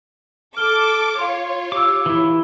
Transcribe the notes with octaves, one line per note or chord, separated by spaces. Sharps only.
A4 D6 F6 G7
F4 C#5 F5 C6
G4 D6 E6
E3 E4